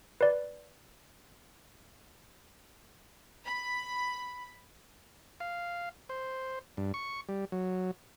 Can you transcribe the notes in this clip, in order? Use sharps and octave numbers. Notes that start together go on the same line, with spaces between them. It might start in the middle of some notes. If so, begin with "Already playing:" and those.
B4 D5
B5
F5
C5
G2
C#6
G3
F#3